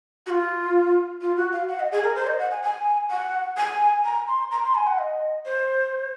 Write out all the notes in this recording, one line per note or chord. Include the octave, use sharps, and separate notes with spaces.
F#4
F4
F4
F#4
F5
F#5
D#5
G#4
A#4
C5
D#5
F#5
G#5
G#5
F#5
G#5
A#5
C6
A#5
C6
G#5
F#5
D#5
C5